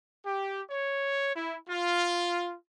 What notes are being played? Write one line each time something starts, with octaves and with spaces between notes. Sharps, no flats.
G4
C#5
E4
F4